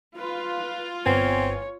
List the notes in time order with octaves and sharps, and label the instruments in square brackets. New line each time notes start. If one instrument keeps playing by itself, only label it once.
[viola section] F4 [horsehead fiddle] B4
[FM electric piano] G1 B3 G#5 [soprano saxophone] C4 [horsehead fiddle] C#5